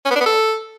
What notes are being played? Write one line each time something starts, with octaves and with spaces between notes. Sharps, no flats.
C#4
B3
D4
B3
A4